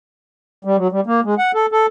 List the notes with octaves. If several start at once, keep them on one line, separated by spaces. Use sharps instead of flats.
G3
F#3
G3
A#3
G#3
F#5
A4
A4